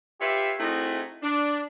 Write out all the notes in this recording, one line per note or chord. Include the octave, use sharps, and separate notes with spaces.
F4 G4 B4 C#5 E5
A3 C4 D#4 E4 F#4 G#4
D4